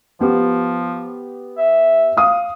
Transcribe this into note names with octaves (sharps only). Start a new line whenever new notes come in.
F3 B3 G4
E5
F5 D#6